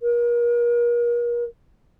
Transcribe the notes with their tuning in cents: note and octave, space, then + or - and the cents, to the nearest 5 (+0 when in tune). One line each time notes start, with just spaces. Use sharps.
A#4 +35